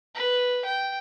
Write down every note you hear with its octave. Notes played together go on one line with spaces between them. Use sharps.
B4
G5